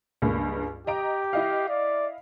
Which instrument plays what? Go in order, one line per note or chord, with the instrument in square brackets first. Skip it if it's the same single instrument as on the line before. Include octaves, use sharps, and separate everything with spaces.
[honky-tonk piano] C#2 G2 A#3
[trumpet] G4 [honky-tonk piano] D#5 A#5 D7
[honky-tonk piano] E4 D#5 F5
[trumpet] D5